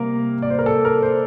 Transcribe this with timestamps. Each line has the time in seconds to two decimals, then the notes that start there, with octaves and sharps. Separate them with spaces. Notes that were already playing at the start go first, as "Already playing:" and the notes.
Already playing: C3 G3 A#3 A#4
0.42 D5
0.50 C5
0.59 A#4
0.66 A4
0.85 A#4
1.03 C5